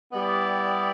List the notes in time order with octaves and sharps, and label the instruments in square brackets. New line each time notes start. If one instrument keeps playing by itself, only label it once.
[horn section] G3 B3 [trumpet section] E4 G4 D5